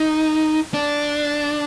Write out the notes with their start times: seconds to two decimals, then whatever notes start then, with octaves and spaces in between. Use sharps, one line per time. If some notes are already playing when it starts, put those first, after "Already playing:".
Already playing: D#4
0.74 D4